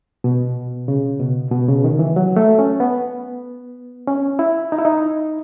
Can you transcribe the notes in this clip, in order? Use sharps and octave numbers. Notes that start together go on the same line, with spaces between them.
B2
C#3
B2
B2
C#3
D#3
E3
F#3
A3
C#4
B3
C#4
E4
D#4
E4
D#4